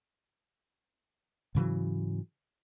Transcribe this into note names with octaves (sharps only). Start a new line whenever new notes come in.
G#2 C#3 E3 F#3